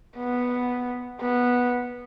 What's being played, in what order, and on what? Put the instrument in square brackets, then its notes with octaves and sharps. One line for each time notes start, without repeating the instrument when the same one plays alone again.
[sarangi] B3
B3